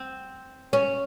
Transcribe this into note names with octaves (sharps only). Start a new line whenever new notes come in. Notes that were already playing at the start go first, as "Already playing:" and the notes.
Already playing: C4
C#4